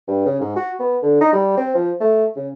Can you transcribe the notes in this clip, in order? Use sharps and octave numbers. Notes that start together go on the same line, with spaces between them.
G2
C#3
G#2
F#4
B3
D3
D#4
G3
C4
F3
A3
C#3